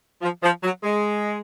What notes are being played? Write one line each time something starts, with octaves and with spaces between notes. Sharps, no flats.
F3
F3
F#3
G#3